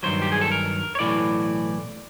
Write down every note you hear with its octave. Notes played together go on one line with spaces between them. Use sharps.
G2 D#3 F#3 C5
G4
G#4
A4
A#4
C#5
B1 A2 E3 D5